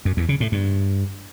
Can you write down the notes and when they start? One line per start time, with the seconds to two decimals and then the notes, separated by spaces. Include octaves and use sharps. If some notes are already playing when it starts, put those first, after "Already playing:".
0.05 F#2
0.17 E2
0.29 C#3
0.40 A2
0.52 G2